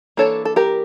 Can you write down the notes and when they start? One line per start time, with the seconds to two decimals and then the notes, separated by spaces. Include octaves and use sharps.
0.17 E3 A#3 D4 A4 C#5
0.45 A4
0.56 G4 A#4